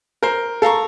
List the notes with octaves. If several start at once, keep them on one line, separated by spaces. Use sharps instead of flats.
A#4 C5
A4 F5 A#5 C#6